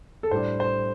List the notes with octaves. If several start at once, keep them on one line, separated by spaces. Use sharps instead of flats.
A4
A2 G3 D4 C5
C5